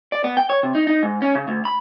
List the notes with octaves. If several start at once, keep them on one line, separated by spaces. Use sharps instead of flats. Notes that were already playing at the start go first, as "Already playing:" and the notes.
D5
B3
G5
C#5
C3
D#4
D#4
G#2
C#4
C#3
D2
B5